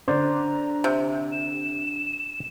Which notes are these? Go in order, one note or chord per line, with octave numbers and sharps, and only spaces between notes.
D3 C5 D5 A#5
C3
E7